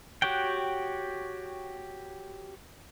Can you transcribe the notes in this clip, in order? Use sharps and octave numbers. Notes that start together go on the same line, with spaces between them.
F#4 G4 C#5 F#5 G5